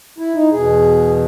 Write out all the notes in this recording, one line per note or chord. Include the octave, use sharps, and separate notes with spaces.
E4
D#4
E2 B2 G#4